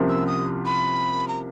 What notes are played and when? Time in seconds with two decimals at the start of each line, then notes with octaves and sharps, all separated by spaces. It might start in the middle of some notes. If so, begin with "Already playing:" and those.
Already playing: C2 C3 F3 A#3 C#4
0.09 E6
0.27 D#6
0.66 B5
1.28 A#5